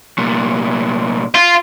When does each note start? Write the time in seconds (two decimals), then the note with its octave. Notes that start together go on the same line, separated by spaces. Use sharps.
0.18 C2 A#2
1.35 F4